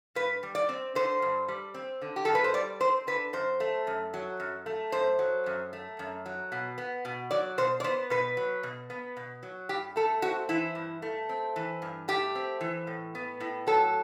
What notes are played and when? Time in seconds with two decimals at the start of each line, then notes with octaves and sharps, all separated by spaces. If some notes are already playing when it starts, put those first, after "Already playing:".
0.15 G2 B4
0.43 G3
0.55 D5
0.69 C4
0.95 D3 C5
1.22 G2
1.48 G3
1.74 C4
2.02 D3
2.16 G4
2.25 G2 A4
2.35 B4
2.44 C5
2.54 G3 D5
2.80 C4 C5
3.07 D3 B4
3.33 F#2 C5
3.60 A3
3.87 F#2
4.14 F#3
4.40 F#2
4.66 A3
4.92 F#2 C5
5.19 F#3
5.46 F#2
5.73 A3
5.99 F#2
6.26 F#3
6.52 B2
6.78 B3
7.05 B2
7.31 F#3 D5
7.58 B2 C5
7.80 D5
7.84 B3 C5
8.10 B2 B4
8.37 F#3
8.63 B2
8.90 B3
9.17 B2
9.43 F#3
9.69 G2 G4
9.96 A3 A4
10.22 C4 F#4
10.49 E3 E4
10.75 G2
11.02 A3
11.29 C4
11.56 E3
11.82 G2
12.08 A3 G4
12.35 C4
12.61 E3
12.87 A2
13.15 B3
13.40 A2
13.67 F#3 A4